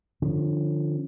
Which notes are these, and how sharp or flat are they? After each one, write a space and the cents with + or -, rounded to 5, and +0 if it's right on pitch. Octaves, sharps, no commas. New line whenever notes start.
D3 +25 F3 +0 C#4 +0